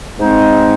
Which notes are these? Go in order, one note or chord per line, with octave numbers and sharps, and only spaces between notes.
G#2 G#3 C4 D#4